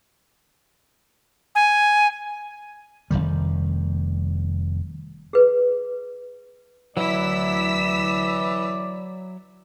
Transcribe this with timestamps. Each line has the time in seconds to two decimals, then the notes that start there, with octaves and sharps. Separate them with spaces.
1.55 G#5
3.11 F1 C#2 D#3 G3
5.33 G#4 B4
6.97 D2 E3 F#3 E4 D5 E6 B6